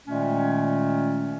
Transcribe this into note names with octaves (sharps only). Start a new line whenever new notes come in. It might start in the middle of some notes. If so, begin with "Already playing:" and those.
A#2 D#3 G#3 A3 C#4